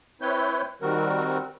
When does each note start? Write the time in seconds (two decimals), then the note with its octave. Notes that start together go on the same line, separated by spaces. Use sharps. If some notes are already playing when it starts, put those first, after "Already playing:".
0.21 C4 E4 B4 C#5 G6
0.82 D#3 G3 C4 F#4 A#4